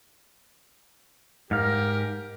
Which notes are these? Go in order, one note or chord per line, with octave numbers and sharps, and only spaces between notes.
G#2 G4 A#4 F5